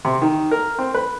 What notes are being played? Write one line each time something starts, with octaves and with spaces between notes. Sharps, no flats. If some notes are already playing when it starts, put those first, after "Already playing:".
C3
D#3
A#4
C4
B4